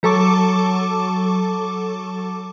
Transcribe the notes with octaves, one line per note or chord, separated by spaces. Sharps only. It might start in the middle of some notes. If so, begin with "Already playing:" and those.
F#3 A4 A5 C#6 D6